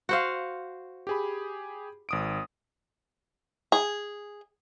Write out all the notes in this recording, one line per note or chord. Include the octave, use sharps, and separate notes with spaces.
F#4 C5 F5
G4 G#4 B5
G#1 D#6 D7
G#4